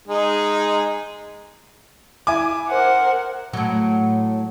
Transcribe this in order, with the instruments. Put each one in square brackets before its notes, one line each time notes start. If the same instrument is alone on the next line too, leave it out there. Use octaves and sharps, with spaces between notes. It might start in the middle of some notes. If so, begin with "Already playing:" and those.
[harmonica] G#3 D#4 G#4
[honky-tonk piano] E4 G#5 D6
[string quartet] A#4 C5 F#5
[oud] A2 F#3